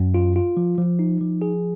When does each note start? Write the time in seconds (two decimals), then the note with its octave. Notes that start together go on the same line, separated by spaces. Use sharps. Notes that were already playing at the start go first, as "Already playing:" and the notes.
Already playing: F#2
0.14 F4
0.36 F4
0.57 F3
0.78 F3
0.99 D#4
1.21 F3
1.42 G#4